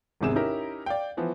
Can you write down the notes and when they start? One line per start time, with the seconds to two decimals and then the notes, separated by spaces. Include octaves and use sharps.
0.21 G#1 E2 G#2 C3 G#4 E7
0.35 C#4 D#4 E4 G4 A#4
0.86 D5 F5 G5
1.17 E3 F3 B3